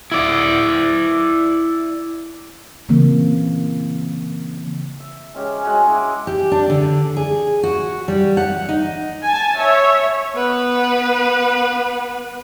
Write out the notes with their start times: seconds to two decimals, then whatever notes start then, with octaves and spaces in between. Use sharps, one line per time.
0.12 E4 D5
2.89 C#3 E3 A#3 C4
5.00 E5
5.35 G#3 C#4 G4
5.63 G#3 F#4 C#5 D#5
5.87 E4 D6
6.27 G4
6.52 D4
6.70 D3
7.17 G#4
7.63 F#4
8.08 G3
8.37 F#5
8.69 D#4
9.23 G#5 A5
9.57 C#5 E5
10.36 B3 B4